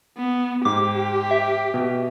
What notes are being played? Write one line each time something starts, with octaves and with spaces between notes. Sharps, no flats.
B3
G#2 G4 D6
E5
B2